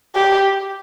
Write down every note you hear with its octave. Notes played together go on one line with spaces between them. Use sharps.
G4